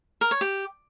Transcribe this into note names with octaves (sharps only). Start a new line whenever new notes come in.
A#4
C#5
G4